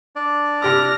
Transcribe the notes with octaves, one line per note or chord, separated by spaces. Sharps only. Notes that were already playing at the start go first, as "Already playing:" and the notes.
D4 D5
C3 G4 D6 F6 A#6